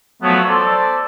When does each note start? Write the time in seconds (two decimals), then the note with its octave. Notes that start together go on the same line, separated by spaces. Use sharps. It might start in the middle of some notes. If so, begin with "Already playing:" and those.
0.22 F3 F#3 A3 B3
0.46 A4 C5 D5